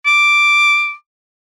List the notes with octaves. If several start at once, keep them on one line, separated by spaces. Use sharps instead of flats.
D6